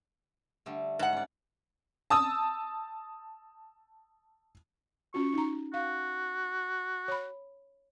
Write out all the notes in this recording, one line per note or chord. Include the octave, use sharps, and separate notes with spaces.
D3 G3 A3
G#2 F#5
C#4 D5
A5 D#6 E6
C#4 F4 F#4 C#6
D#4 A#5
F#4 F5
C#5 B5